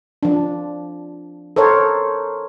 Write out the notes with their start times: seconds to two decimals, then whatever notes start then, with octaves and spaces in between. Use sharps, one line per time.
0.23 F3 D4
1.56 A4 A#4 C5 C#5